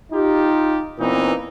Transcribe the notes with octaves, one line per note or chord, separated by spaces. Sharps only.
D#4 F4 G4
A#2 E3 B3 C4 D#4